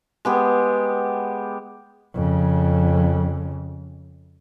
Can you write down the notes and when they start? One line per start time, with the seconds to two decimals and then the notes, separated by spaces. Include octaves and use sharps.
0.25 G#3 B3 G4
2.14 F2 C#3